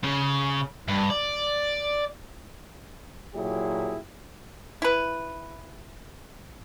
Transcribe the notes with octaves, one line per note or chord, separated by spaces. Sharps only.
C#3
G2
D5
A#2 F#3 E4 G4 G#4
E4 B4